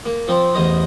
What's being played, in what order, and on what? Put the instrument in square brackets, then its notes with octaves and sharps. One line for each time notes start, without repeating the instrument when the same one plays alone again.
[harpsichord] A#3
F3 C4 C5
A1 E2 C5 D#5 A#5